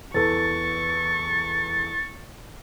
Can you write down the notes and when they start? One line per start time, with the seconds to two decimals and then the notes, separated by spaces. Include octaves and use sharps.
0.14 E2 A4 B4 C#6 A6